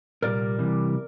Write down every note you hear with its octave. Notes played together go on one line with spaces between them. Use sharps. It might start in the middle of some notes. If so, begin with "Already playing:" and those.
C2 A#2 G3 A#4 D5
C2 C3 E3 G3